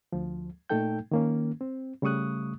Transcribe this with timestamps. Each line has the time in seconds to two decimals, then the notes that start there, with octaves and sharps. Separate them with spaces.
0.12 D2 F3
0.69 A#2 A3 D#4 A4 G5 G6
1.11 D#3 A#3 C#4
1.61 C4
2.02 C#3 G3 A3 C#6 D#6 F#6